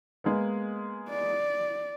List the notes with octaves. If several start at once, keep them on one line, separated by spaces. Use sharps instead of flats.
G#3 A#3 B3
D5